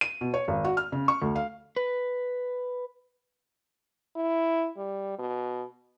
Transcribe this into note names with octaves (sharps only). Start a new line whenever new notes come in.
D#7
B2
C#5
G#1
F#4
F6
C#3
C#6
D2
F5
B4
E4
G3
B2